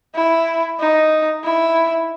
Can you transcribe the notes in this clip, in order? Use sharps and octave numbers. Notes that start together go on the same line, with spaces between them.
E4
D#4
E4